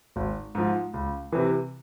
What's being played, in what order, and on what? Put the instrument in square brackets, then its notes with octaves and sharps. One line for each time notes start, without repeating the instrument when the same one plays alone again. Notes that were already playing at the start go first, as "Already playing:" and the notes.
[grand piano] G#1
G#2 F3
C#2
C3 E3